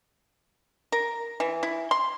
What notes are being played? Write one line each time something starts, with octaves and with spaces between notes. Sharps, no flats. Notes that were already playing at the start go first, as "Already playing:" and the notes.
A#4
E3
E4
C6